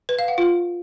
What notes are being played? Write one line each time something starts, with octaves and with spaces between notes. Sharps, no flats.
B4
F5
F#5
F4